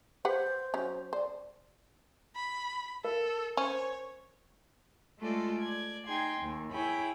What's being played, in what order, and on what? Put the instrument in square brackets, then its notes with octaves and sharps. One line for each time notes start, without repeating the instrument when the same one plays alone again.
[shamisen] G4 B4 F#5 [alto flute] C5
[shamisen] F#3 C#4
[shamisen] C5 [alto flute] D5
[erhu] B5
[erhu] A4 [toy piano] A#4
[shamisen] C#4 [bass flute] C5 [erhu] C#5
[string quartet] G#3 A3 F4 A4 D5
D5 G#6
D#4 G#4 G5 C6 G#6
D#2
E4 G#4 C#5 G5 B5